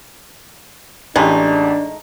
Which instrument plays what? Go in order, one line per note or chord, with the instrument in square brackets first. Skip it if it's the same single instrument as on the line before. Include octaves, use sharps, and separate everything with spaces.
[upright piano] A1 G4 [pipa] G#3 A3 D#4 [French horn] D4